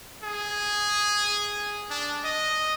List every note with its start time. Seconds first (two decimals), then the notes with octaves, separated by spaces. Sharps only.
0.24 G#4
1.90 D4
2.25 D#5